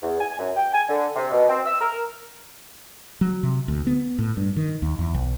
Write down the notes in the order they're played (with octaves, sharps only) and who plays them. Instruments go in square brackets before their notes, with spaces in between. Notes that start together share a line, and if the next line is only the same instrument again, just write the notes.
[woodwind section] E2
G#5
F#2
G5
G#5
D3
C3
B2
C4
E6
A#4
[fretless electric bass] F#3
C3
D2
B3
A2
G2
D#3
D#2
E2
B1